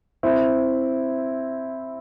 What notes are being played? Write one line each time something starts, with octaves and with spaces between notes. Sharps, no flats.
C4 E4